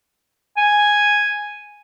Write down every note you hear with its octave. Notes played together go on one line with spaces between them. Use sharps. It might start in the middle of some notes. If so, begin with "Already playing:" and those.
G#5